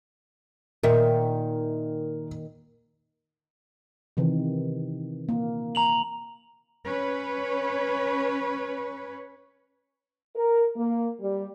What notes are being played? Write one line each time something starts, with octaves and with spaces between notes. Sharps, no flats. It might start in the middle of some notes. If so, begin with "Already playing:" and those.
A#2 D#3 A#4 E5
C3 D#3 E3
A#3
A#5 F7 F#7
C#4 B4 C#5
A#4
A#3
G3